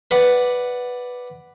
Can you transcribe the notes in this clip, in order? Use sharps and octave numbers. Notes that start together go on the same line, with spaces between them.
B4 D5 F#5